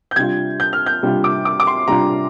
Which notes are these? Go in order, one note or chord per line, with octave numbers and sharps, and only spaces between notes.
G6
C3 G3 D4 F4 G#6
G6
F6
G6
C3 G3 D4 F4
D6
D6
D6
C6
C3 G3 D4 F4 A#5